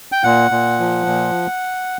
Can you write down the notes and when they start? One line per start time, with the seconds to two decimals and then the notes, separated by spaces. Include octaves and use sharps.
0.12 G5
0.24 A#2 F#5
0.51 A#2
0.80 F3
1.07 A#2